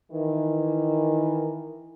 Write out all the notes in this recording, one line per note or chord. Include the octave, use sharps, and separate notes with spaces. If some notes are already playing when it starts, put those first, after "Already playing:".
D#3 E3